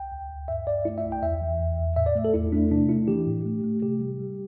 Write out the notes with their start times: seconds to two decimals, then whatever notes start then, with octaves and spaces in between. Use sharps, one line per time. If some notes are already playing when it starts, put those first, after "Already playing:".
Already playing: C2 G5
0.12 D2
0.30 D2
0.48 G2 E5
0.67 G2 D5
0.85 A3 E4
0.98 E5
1.04 C2
1.12 G5
1.22 E2 E5
1.41 E3
1.60 E2
1.79 E2
1.96 A2 E5
2.06 D5
2.15 A3
2.25 A4
2.34 E2 E4
2.52 A3 D4
2.71 C3 D4
2.89 A3 E4
3.08 E3 G4
3.26 A2
3.46 A3
3.64 A3
3.82 C3 G4
4.00 G3
4.19 G3